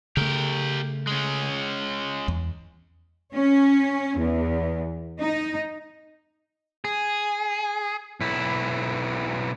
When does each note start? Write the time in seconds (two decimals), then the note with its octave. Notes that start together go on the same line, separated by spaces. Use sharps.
0.17 C#3 A3 G4 A#4
1.07 G#3 C#4
2.28 E2
3.33 C#4
4.19 E2
5.20 D#4
6.85 G#4
8.21 B1 E4